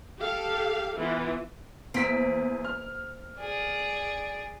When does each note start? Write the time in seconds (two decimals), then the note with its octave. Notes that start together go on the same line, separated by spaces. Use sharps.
0.20 G4 A4 F5
0.98 E3 B3 F4
1.94 E2 A#3 C4 B6
2.65 F6
3.38 G#4 D5